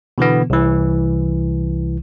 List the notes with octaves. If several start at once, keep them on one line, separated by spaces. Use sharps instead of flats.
B2 D3 E3 B3
C2 E3